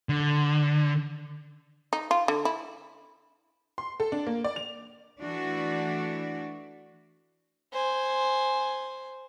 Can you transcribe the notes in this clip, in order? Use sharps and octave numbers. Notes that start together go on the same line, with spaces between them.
D3
D#4
F4
D3
E4
C6
A4
D4
A#3
D5
F7
E3 A3 D4 F#4
C5 G#5